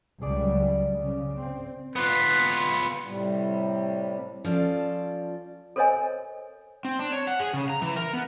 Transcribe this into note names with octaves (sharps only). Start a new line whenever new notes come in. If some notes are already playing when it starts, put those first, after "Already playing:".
C#2 F#3 G3 G#4 D5
C#3
C4
B3 F4 B4
A2 C3 G3
F3 C#4 F4 A4 D5
A4 A#4 C5 C#5 D#5 G#5
C4
D4
C#5
F#5
G#4
C#3
A#5
E3
A#4
B3